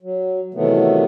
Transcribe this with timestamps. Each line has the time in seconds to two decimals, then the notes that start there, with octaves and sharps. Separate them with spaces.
0.02 F#3
0.54 C3 D#3 E3 F#3 A3 B3